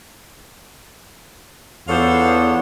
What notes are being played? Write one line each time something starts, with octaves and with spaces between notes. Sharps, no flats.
E2 B3 D4 F4 A4 C5 C#5